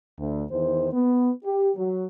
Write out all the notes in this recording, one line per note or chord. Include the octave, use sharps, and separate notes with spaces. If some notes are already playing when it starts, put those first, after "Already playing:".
D2
E2 D#3 C5
B3
G4
F#3